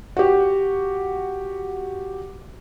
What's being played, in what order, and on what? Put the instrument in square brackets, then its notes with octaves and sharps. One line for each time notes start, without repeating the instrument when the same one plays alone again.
[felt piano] F#4 G4